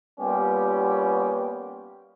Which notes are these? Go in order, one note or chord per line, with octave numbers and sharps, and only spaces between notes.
G3 A#3 B3 C#4 F4 G4